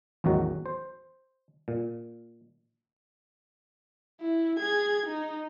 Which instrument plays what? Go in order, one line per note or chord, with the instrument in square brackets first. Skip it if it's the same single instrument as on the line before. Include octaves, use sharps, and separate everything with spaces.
[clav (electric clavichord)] A1 E2 D#3 F#3 F#4
C5
A#2
[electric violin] E4
G#4 G#6
D#4